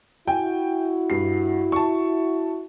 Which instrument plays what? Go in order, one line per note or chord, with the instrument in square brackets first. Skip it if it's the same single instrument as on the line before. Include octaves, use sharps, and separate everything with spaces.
[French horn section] E4 F#4 [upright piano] G5 G#5
[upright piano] G2 C7
A5 C#6